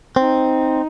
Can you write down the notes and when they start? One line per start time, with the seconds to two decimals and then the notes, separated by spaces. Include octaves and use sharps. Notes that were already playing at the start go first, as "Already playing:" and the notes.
0.16 C4 D#4